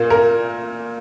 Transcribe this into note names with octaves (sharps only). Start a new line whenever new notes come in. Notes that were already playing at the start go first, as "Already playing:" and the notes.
Already playing: A#2 A#3
A#4